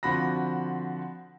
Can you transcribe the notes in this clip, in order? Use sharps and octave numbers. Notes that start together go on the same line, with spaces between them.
D3 F3 C4 F#4 B5 A#6